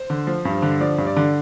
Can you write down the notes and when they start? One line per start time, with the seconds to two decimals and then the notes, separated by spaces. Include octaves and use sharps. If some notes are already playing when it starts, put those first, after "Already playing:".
Already playing: C5
0.10 D3
0.27 F3
0.45 G2
0.62 D3
0.80 F3 D5
0.98 G2
1.07 D5
1.17 D3